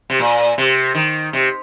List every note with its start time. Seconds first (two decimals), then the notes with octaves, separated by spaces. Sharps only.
0.10 C3
0.19 A#2
0.58 C3
0.95 D#3
1.33 C3